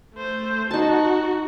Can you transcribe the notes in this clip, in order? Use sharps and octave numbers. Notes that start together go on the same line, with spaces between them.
A3 C5
D#4 F#4 A5